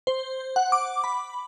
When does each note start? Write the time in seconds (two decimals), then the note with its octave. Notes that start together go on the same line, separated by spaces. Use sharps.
0.07 C5
0.56 F#5
0.72 D6
1.04 B5